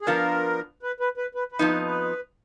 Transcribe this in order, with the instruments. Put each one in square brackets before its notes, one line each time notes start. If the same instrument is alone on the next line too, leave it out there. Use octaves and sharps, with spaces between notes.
[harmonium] G#4
[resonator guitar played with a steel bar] F3 B3 D4 F4 [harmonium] A#4
[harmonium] B4
B4
B4
B4
B4
[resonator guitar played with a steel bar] F2 F3 B3 D#4
[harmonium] B4
B4